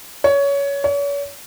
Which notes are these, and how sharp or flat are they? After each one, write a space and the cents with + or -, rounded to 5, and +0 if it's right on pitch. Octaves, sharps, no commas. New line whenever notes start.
C#5 +20
C#5 +40